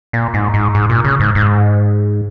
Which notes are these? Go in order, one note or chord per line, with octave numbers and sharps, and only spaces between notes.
A#2
G#2
G#2
G#2
A#2
C#3
G#2
G#2